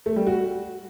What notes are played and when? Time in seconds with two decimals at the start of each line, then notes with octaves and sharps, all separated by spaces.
0.06 A3
0.16 G3
0.27 F#4